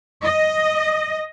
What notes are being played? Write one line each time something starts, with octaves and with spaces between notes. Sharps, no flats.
D#5